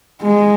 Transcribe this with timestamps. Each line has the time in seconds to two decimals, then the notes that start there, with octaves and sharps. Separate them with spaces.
0.22 G#3